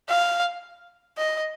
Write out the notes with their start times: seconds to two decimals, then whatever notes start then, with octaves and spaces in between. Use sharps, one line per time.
0.09 F5
1.18 D#5